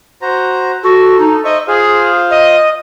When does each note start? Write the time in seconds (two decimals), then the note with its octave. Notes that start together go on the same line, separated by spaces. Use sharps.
0.22 F#4 C5 A#5
0.83 F#4 A4
1.19 D#4
1.44 C5 D#5 E5 C#6
1.67 F4 G#4 C5 F5
2.31 D#5